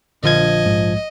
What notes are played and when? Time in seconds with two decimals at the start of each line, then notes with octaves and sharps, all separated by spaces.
0.24 A#1 D3 F3 D#5 G#6
0.66 G#2